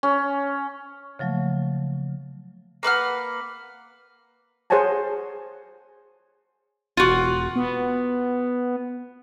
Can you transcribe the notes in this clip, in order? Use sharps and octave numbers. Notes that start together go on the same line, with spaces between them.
C#4
C#3 F3 F#3 A3 A#3
A#3 B4 F#5 F6
G#4 C5 C#5 F#5 G#5 A5
E1 F4 F#4
B3